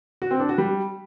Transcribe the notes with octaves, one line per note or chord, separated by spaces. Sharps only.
F#4
C4
D4
F#4
G3